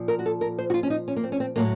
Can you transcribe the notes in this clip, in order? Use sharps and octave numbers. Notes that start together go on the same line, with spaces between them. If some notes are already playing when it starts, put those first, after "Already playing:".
Already playing: A#2 F3
A#4
F#4
A4
A#4
C5
F#4
F4
C#4
D#4
C#4
A#3
C4
C#4
C4
A2 F#3 A#3